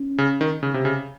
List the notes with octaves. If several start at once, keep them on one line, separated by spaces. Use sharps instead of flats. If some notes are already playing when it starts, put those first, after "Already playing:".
Already playing: C#4
C#3
D#3
C#3
C3
C#3